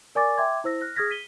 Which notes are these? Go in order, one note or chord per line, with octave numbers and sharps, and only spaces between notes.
A#4 D5 G#5 C#6 D6 A6
E5 G5 C6 D6 G#6
E4 C5 E6 A#6
F6 F#6 A#6
G#4 D#6 F6 G#6 A#6 B6
B6 D#7 G7